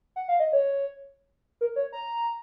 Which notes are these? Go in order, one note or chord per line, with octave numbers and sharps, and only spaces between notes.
F#5
F5
D#5
C#5
A#4
C#5
A#5